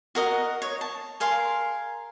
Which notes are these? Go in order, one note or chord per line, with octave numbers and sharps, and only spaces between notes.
F#4 A#4 D#5 F#5
C#5
A5
G#4 A#4 F5 C6